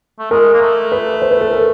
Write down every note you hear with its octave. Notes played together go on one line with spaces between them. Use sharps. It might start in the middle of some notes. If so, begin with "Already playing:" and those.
A3
G#3 A#4
A#3
A3
B4
C5
B4
A4
A#4